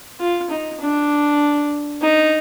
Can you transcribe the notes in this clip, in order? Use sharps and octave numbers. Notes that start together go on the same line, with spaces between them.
F4
D#4
D4
D#4